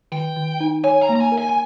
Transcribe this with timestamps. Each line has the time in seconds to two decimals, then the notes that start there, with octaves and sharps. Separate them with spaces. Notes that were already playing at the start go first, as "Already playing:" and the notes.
0.12 D#3 G5
0.36 D#3
0.60 D#4
0.84 C#5 G#5
1.02 A#5
1.09 A#3
1.16 A#5
1.20 G#5
1.32 A#4
1.38 G#5
1.49 G#5